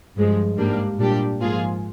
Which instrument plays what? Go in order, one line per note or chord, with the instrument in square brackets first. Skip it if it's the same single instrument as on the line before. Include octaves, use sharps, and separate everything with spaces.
[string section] G2 F3 G#3
G#2 G3 A#3 D4
A#2 G3 D4 G4
G#2 F3 A#3 F4 G#4